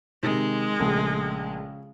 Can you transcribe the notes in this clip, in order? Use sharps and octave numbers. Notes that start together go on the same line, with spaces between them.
C3 D#3 G#3
A#1 C#3 A3